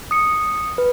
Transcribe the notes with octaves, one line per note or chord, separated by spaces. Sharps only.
D#6 C#7
B4